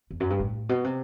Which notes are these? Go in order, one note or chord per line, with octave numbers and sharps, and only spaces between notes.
E2
F#2
G2
A2
B2
C3